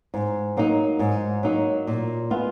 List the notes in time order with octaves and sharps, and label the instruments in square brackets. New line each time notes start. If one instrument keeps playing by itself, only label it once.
[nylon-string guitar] G#2
F#3 A#3 D#4
G#2
F#3 A#3 D#4
A#2
G#3 B3 F4